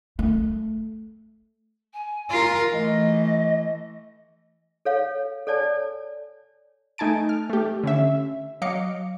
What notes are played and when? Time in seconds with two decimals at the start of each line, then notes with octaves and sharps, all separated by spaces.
0.19 A3
1.93 G#5
2.30 F4 A#4
2.72 E3 A3 D#5
4.85 A4 C#5 F5
5.47 A4 C#5 D5 G#5 A5
6.98 A3 D#4 G#5 A5 D7
7.29 F6
7.50 A3 G4
7.84 D3 C#4 E5
8.62 F#3 D#5 F5 D6 C#7